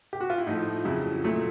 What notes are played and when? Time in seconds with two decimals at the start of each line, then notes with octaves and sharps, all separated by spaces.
0.13 G4
0.21 F#4
0.30 F4
0.38 E4
0.47 A2 F3 A3 D#4
0.85 F2 C#3 F#3 E4
1.24 A#2 F#3 A3